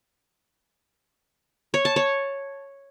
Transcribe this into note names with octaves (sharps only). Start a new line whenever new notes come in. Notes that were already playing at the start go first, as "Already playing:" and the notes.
C#5
A5
C#5